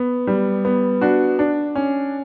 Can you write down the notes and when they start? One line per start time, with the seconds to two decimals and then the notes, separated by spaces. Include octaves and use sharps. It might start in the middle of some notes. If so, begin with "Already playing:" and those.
Already playing: B3
0.27 G3
0.65 B3
1.01 D4 F#4
1.39 D4
1.75 C#4